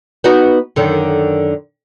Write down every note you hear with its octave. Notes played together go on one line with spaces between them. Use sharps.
B3 D#4 F#4
F#2 D3 D#3